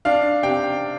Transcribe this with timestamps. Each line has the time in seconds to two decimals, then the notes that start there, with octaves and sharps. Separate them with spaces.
0.05 D4 F5
0.43 C3 G5